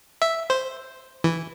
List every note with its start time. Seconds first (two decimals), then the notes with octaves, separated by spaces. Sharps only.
0.22 E5
0.50 C5
1.24 E3